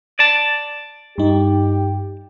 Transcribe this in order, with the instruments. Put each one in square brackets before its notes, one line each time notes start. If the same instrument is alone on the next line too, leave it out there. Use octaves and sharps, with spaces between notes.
[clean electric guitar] D5 A5
[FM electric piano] G2 D#4 [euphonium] G4